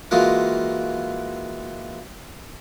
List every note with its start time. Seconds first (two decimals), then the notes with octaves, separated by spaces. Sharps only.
0.11 E3 G#3 A#3 F4 F#4 A#4